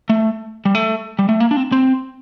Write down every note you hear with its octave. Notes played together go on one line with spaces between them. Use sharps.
A3
G3
A3
G3
A3
A#3
D4
C4
C4